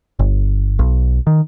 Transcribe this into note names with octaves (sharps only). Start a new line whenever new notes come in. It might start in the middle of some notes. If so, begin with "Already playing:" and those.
G1
B1
D#3